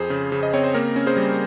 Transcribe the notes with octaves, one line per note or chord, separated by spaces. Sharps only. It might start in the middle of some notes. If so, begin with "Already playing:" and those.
Already playing: F2 G#4 C5
C#3
C#3
D#5
C4 C#5
C5
A#3 A#4
C#4
G#4 C5
G3